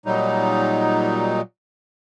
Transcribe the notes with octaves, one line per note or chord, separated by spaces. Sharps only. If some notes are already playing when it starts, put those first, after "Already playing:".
A#2 F#3 G3 D#4